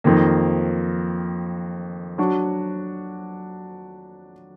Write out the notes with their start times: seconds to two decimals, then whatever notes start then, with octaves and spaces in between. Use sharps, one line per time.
0.04 F2 D#3 A#3
2.18 F#3 D4 F#4